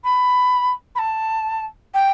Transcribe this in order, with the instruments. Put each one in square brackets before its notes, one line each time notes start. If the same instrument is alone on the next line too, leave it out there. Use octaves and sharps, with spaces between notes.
[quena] B5
B5
A5
G5